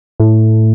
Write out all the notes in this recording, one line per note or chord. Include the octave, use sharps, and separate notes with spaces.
A2